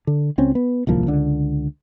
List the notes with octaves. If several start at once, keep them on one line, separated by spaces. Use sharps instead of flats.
D3
C#2 C4 C#4
B3
D1 C2 F3 A#3
C#2 D3